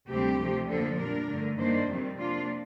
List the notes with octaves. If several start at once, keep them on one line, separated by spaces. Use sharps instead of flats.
D2 C3 G3 C4 G4
C3 F3 A3
F2 D3 F3 A#3 D4 A4
A#2 G3 D4 A#4
G2 D3 A3
G2 D#3 A#3 D4 C5
F2 C3 D#3 G3 C4
C3 F3 A#3 D4 F4